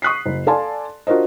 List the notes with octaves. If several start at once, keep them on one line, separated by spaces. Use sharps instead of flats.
C#6 D#6 F#6 B6 C7
F#1
A4 D5 F5 G#5 A5 C6
D4 F4 F#4 A#4 C5 D#5